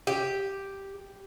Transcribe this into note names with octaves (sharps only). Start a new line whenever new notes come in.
G4